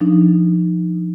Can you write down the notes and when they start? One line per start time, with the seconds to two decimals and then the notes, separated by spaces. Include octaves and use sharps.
0.01 F3 D4 D#4